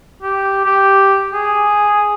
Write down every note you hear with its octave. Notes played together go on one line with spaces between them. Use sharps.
G4
G4
G#4